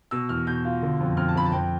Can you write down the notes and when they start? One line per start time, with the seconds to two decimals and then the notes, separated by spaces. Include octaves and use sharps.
0.11 B2 E6
0.29 E2 F6
0.47 B2 G6
0.65 F4
0.82 D3
1.00 F2
1.17 F2 F6
1.29 A5
1.35 F2 B5
1.45 A5
1.52 F2 G5